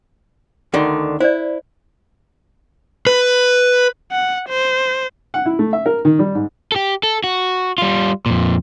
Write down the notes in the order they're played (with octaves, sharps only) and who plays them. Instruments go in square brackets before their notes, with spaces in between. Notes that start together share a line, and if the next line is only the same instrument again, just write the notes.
[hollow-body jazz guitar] D2 D3 D#3
[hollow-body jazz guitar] E4 [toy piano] C5 D5
[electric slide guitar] B4
[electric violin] F#5
C5
[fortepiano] F#5
E4
A3
E5
A#4
D#3
G3
G#2
[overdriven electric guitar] G4 A4
A4
F#4
G3 F4
F2 A#2